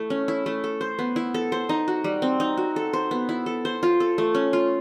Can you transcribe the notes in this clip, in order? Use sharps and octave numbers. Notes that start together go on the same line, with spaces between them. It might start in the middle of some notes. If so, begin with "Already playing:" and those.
Already playing: A3 E4
C#4
E4
A3
A4
C5
B3
E4
A4
C5
D#4
F#4
G3
C4
D#4
F#4
A4
C5
B3
E4
A4
C5
F4
A4
A3
C#4
F4